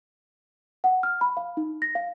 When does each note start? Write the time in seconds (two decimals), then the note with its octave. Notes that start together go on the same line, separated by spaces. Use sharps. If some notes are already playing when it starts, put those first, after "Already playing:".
0.84 F#5
1.03 F6
1.21 B5
1.37 F5
1.57 D#4
1.82 A#6
1.95 F5